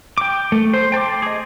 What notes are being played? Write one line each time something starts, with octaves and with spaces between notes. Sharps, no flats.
G5 D6
A3
C5
G5 A5 C6 D6
G#4 D#5